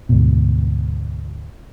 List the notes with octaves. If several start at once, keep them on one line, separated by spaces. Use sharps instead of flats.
D2 G#2 B2